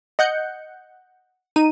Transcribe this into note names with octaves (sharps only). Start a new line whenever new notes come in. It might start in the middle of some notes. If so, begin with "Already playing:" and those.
D#5 F#5 F#6 G6 C#7
D#4 D#7